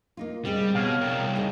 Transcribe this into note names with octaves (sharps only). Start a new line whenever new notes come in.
A#3 D#4 F4
G3 G#3 C4 G#4
B2 C#5 F5
D4 A#4 G5
C2
D#4 G#4